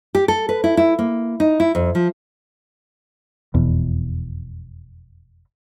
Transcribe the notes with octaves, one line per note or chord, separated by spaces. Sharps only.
G4
A4
B4
E4
E4
A#3
D#4
E4
F2
F3
F1 E2 B2